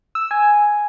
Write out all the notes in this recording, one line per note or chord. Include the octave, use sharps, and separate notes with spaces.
E6
G#5